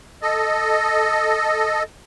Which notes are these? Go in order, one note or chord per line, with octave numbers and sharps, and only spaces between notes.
A4 D#5